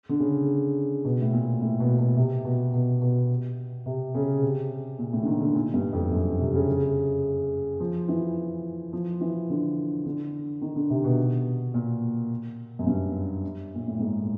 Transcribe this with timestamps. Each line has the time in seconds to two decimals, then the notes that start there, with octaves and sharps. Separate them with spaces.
0.09 D3
0.20 C#3
1.05 B2
1.21 A2
1.33 A#2
1.61 A2
1.80 B2
1.99 B2
2.17 C3
2.45 B2
2.74 B2
3.02 B2
3.86 C3
4.15 C#3
4.42 C3
4.98 A#2
5.13 A2
5.22 D3
5.27 D#3
5.41 D3
5.55 A#2
5.74 G2
5.93 F2
6.12 F#2
6.40 C3
6.54 C#3
7.80 F3
8.08 E3
8.93 F3
9.21 E3
9.50 D3
10.06 D3
10.61 D#3
10.76 D3
10.90 C3
11.04 B2
11.74 A#2
12.79 F#2
12.87 G2
13.75 A#2
13.87 A2
13.99 G#2